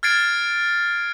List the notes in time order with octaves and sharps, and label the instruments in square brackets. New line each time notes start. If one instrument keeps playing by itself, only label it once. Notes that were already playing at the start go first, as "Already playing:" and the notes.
[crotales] F6 G#6 A6 C7 D7